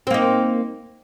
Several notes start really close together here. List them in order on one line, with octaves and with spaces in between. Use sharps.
C4 A#3 D#4